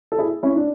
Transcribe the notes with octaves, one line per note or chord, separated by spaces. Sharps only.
A4
E4 G#4
C#4 E4
D4